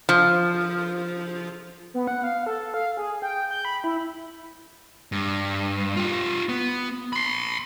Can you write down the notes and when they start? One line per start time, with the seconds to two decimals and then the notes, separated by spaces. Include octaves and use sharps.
0.09 F3
1.94 B3
2.07 F#5
2.23 F5
2.46 A4
2.74 F5
2.97 G#4
3.22 G5
3.51 G6
3.65 B5
3.84 E4
5.12 G2
5.96 F4 G4
6.49 B3
7.13 B5 C6